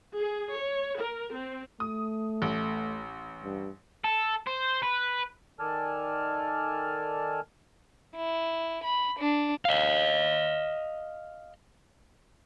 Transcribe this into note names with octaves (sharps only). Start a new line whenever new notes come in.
G#4
C#5
A#4
C4
A3 D#6
A1
G2
A4
C5
B4
D#3 A4 D5 G#5 A5 F6
E4
B5
D4
D#5 F5